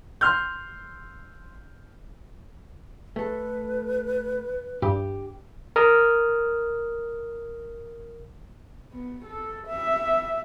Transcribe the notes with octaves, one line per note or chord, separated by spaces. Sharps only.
C6 F6 G6
A3 A4 B4
G2 G4
A#4 D#6 F6
B3
A4
E5